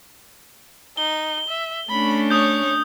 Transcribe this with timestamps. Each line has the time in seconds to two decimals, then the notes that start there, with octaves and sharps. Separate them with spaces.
0.97 D#4 G7
1.48 E5
1.90 A3 C#4 D4 B5
2.30 C#5 D#6 G6